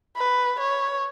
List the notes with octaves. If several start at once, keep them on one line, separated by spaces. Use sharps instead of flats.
B4
C#5